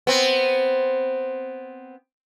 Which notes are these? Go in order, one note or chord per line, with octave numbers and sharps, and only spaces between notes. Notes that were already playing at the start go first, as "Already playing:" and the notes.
B3 C4